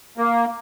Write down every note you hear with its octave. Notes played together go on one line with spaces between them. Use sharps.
A#3